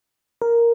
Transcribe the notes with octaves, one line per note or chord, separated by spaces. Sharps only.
A#4